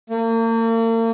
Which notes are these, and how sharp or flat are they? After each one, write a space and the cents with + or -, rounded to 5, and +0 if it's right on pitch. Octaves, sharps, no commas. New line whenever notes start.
A#3 -40